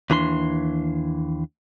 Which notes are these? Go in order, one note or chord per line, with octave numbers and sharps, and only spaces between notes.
D#2 E3 D4 B5 C6